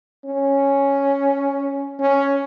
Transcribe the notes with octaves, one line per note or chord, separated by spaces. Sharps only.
C#4
C#4